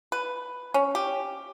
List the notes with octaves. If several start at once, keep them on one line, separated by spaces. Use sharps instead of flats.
B4
C#4
G4